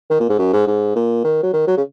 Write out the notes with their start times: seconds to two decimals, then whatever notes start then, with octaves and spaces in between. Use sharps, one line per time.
0.10 D#3
0.20 A#2
0.29 G#2
0.39 F#2
0.53 G#2
0.67 G#2
0.95 A#2
1.24 D#3
1.43 F#3
1.53 D#3
1.67 F#3
1.77 C#3